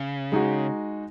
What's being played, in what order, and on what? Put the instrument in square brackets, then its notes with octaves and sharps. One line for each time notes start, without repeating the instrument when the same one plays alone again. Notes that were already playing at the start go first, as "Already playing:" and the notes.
Already playing: [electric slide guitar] C#3
[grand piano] G#3 D#4 F#4